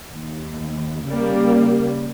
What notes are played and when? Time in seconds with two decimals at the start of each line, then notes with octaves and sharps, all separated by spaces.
0.13 D#2
1.07 C#3 G3 A#3